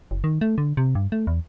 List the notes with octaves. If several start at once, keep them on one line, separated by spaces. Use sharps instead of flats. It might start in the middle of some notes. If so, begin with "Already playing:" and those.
F#1
D#3
A3
D3
C3
G2
A3
E2